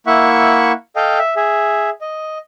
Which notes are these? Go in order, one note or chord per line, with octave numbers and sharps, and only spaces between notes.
A#3 E4 E5 F#5 C#6
A4 D#5 F5 G5
E5
G#4 E5
D#5